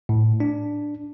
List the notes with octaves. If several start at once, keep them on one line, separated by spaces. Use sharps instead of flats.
A2
D4